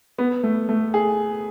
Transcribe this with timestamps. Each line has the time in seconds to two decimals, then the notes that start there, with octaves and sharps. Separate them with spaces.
0.18 B3
0.43 A3
0.69 A3
0.94 G#4